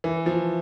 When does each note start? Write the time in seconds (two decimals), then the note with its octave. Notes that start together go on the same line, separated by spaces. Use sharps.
0.04 E3
0.26 F3